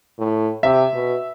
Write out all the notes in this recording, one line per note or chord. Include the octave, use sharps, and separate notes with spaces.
A2
C3 E5
B2